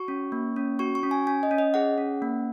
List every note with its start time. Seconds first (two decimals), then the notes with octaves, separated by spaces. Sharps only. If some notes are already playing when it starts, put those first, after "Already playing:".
Already playing: F#4 C#6
0.08 C#4
0.32 A#3
0.56 C#4
0.79 F#4 C#6
0.95 C#6
1.03 C#4
1.11 G#5
1.27 C#4 G#5
1.43 D#5
1.51 C#4
1.58 D#5
1.74 G#4 F#5
1.98 C#4
2.22 A#3